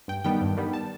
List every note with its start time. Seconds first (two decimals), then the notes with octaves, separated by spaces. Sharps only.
0.08 G2 G5
0.24 D#3 G3 B3 G5
0.41 G2
0.57 D#3 G3 B3
0.73 A5